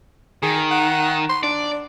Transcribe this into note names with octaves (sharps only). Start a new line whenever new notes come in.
D#3 G#4
F#5
C6
D4 D5